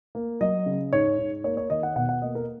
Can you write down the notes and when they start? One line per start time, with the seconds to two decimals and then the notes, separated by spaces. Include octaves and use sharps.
0.15 A#3
0.41 F#3 D#5
0.66 C#3
0.93 G#2 C#5
1.18 G#2
1.44 A#3 C#5
1.57 C#5
1.70 D#3 D#5
1.83 F#5
1.96 B2 F#5
2.09 F#5
2.22 A#3 D#5
2.35 A#4